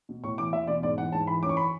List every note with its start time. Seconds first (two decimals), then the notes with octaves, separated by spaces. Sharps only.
0.09 B2
0.23 A2 C#6
0.38 E3 D6
0.53 E2 E5
0.67 B2 D5
0.83 G#2 D5
0.98 E3 F#5
1.12 G#2 A5
1.27 E3 B5
1.43 F#2 D6
1.49 C#6
1.57 B5
1.64 C#6